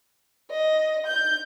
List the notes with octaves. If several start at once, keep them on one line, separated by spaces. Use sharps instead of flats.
D#5
G6